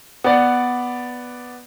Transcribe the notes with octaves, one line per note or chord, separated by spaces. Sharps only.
B3 D5 F#5